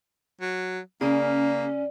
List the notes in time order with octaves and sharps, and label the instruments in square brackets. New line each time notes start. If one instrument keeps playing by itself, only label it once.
[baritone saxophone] F#3
[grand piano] C#3 [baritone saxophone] A#3 [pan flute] C#4 [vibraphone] D5